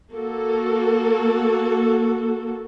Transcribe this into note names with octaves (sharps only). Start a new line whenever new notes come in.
A#3 F#4 A4